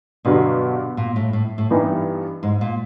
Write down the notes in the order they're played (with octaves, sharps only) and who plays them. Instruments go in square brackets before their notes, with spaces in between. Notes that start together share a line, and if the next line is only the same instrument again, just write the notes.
[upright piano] G2 D3 F#3 [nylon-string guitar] B2
[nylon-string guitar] A#2
A2
A2
A2
[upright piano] G2 E3 G3 B3 D#4
[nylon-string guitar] G#2
A#2